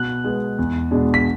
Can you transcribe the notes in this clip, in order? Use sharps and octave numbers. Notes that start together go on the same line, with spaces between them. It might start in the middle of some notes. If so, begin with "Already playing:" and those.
Already playing: B2 F#6
G#3 B3
E2
B2 G#3 D4
B6